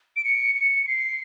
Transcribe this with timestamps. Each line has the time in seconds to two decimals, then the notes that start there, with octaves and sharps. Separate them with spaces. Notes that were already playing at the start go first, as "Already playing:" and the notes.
0.16 D7
0.24 C#7
0.55 C#7
0.87 C7